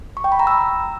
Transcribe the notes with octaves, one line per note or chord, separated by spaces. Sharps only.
C#6
G5
B5
A#5
E6